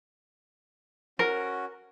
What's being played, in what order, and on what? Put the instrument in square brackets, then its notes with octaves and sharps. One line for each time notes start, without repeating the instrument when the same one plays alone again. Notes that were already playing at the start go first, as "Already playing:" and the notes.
[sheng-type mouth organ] C#4 F#4 [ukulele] A#4